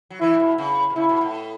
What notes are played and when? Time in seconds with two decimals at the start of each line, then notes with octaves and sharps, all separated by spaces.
0.10 F#3
0.20 E3 E4
0.34 A2
0.40 B2
0.58 C#3
0.90 B2
0.96 C#3 E4
1.09 B2
1.21 A2